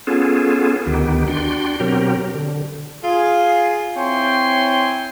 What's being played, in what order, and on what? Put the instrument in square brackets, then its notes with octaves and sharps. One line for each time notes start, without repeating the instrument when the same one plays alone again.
[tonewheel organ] B3 C#4 F4 G#4 A4
D2 D#3 B3 G4
D4 F#4 G5 C6
B2 F#3 C4 G4 A#4
D3
[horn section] F4 G#4
C4 E4 C#5 G5 G#5 C6